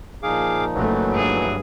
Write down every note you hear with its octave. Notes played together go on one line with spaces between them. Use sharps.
A#2 F3 D#4 G#4 F5 D6
F#1 E3 F#3 A3
G2 G#4